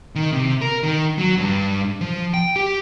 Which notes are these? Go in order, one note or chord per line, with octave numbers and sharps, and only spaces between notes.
D#3
C3
A#4
D#3
F#3
G2
F3
G5
G4